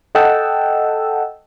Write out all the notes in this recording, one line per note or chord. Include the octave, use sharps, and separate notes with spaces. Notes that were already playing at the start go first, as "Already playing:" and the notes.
A4 D#5 F#5 G5 A5 E6